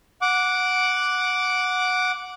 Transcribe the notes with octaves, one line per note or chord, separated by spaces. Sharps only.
F#5 D6